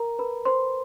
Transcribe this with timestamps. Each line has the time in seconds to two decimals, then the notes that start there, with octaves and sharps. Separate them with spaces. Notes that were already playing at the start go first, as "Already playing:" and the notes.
Already playing: A#4 A#5
0.19 B4 B5
0.45 C5 C6